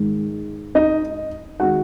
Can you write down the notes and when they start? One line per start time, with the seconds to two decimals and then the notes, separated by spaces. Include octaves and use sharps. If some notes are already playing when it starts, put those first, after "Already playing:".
Already playing: G#2 D#3 G#3
0.75 D#4 D#5
1.60 D#3 G#3 F#4 F#5